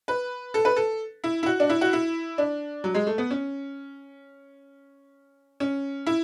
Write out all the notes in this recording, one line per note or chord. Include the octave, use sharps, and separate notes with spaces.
B4
A4
B4
A4
E4
E4
F#4
D4
E4
F#4
E4
D4
F#3
G#3
A3
B3
C#4
C#4
E4